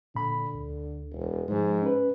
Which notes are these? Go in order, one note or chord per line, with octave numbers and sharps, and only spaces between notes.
A#2 D3 B5
D2
E1
G#2 F3 G#3
C#4 B4